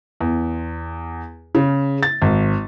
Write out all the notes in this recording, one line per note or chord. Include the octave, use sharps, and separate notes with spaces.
E2
C#3
A6
G#1